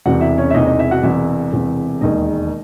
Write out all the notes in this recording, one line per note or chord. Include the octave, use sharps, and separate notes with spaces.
E1 E2 C3 F#4 F#5
E4 E5
C#4 C#5
E5
E1 E2 C3 D#4 D#5
D#4 D#5
E4 E5
F#4 F#5
E1 E2 C3 E4 E5
E1 E2 C3
E1 D#2 D#3 G#3 D#4 D#5